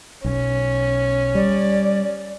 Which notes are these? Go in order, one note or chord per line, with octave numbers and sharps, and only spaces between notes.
B1 C#4
G3 D5